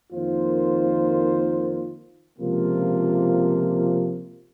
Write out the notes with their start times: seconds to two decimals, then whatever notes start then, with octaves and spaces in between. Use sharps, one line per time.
0.12 F2 D#3 A#3 F4 C5
2.39 C#2 C3 F3 A#3 F4